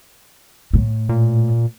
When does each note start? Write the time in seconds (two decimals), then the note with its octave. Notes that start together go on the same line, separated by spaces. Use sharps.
0.73 A2
1.09 A#2